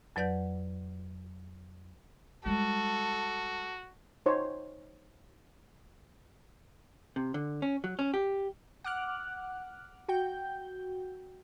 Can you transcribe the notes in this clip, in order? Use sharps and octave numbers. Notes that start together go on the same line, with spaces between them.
F2 F#3 B4 D5 F#5 G6
G3 G#3 F#4 A4
D#4 C5 C#5
C3
D3
C#4
F#3
C#4
G4
F#5 D6 F6 F#6
F#4 G5 G6